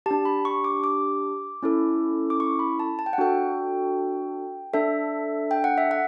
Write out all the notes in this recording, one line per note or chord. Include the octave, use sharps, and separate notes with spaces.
D4 G4 A5
B5
C#6
D6
D6
C#4 E4 A4
D6
C#6
B5
A5
A5
G5
F#5
D4 F#4 A4 G5
D4 A4 E5
G5
F#5
E5
F#5